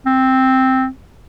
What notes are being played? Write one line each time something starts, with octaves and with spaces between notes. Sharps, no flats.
C4